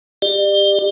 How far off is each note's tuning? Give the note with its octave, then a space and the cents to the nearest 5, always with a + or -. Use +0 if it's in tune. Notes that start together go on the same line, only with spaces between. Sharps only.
G4 +20 D5 +40